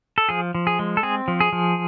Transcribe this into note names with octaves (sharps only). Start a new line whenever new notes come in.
A4
F3 G#4
F3
G#4
G#3
A4
C4 G#4
F3
G#4
F3